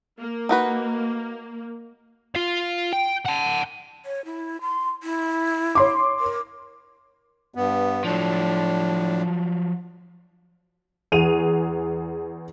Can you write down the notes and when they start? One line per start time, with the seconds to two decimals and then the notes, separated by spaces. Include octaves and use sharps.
0.19 A#3
0.49 D#4 F#4 B4
2.35 F4 F5
2.93 G5
3.25 F#5 A5
4.05 C#5
4.25 E4
4.61 C6
5.03 E4
5.75 C#5 C6 D6
6.20 A#4
7.55 G2 B3
8.04 A2 F3 F#3 D4
11.12 E2 G#4 D#7 F7